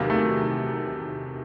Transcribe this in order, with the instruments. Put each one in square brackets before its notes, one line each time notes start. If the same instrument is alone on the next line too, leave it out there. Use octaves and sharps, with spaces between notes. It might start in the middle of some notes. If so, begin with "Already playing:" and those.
Already playing: [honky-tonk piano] E2 C3 D#3 F#3 [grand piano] A#3
[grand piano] A3